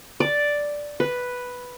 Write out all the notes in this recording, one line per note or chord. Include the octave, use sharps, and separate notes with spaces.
D5
B4